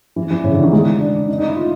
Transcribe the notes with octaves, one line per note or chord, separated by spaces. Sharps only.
E3
E3
C#3
D3
D#3
G#3
D4
D#4
D#4
E4
F4